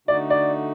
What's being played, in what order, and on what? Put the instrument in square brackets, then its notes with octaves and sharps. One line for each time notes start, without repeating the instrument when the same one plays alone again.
[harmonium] D3 A3 D#4 F#4 [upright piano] D5
[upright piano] D5